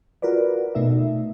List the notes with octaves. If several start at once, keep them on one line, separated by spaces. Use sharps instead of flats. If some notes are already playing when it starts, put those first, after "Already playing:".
F4 F#4 A#4 B4 D5
B2 A3 D#4 E5